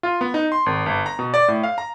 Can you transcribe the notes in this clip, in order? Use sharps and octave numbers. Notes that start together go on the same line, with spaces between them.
F4
B3
D#4
C6
G#1
G1
A#5
B2
D5
A2
F5
A#5